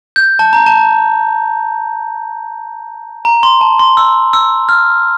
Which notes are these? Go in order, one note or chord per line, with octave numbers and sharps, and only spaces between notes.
G6
A5
A#5
A5
A#5
C6
A5
C6
E6
E6
F6